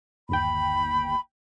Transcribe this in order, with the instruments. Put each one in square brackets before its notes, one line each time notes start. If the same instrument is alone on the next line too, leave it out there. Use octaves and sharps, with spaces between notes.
[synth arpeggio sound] G1 D#2 G5 [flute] B5